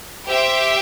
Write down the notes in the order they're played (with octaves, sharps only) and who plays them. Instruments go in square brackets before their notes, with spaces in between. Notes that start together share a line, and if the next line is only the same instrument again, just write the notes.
[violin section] G4 C5 E5 G5